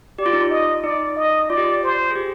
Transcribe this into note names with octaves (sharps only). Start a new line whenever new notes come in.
G4 D5
F4
D#4
F4
D#5
D#4 D5
D#5
F4 D5
G4
F4
C5
G#4
G4